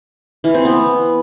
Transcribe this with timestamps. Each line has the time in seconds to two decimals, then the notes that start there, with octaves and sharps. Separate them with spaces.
0.44 E3
0.54 C4
0.65 B3